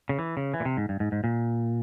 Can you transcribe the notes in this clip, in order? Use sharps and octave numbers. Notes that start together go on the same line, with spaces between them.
C#3
E3
C#3
E3
A#2
C3
G#2
G2
G#2
G#2
A#2